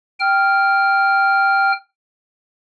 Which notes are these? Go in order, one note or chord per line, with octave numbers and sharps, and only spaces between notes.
G5 F6